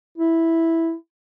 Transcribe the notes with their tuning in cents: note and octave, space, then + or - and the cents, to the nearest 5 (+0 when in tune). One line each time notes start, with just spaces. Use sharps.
E4 -5